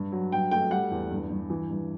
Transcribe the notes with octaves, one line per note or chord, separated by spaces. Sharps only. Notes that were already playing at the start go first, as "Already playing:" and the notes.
Already playing: G2
F#3
G2 G5
A3 G5
G3 F#5
E2
G2
G2
E3
G2